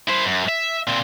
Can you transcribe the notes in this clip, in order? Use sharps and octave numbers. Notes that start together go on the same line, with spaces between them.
E4 C5
F#2
E5
A#2 C4